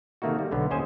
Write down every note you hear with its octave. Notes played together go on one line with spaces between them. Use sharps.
C3 D#3 A3 A#3 D#4 F#4
G3
B1 D3 B3
D#2 C#4 C5 D#5 G#5